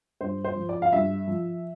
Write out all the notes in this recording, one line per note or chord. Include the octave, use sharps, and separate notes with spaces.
G2 C5
C5
F3
D5
F5
G2 E5
F3